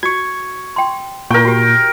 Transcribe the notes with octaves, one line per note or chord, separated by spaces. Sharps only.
F#4 C#6 G#6
G5 C6
A#2 E4 A#4 G5 C#6
F#4 G4